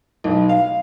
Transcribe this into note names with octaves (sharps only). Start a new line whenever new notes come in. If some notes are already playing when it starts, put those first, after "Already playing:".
B1
F5